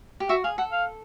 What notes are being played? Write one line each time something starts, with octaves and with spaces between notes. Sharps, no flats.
G4
F#4 E5
G#4 F5
A4 F#5
F5